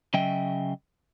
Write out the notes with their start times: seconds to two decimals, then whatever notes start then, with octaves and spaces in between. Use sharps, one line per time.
0.14 C#3 F#3 D#5 E5 G5